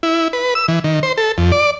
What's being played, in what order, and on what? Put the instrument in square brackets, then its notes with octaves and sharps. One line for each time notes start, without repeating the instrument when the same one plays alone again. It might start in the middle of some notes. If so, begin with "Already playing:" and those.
[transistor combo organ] E4
B4
E6
E3
D#3
C5
A4
F2
D5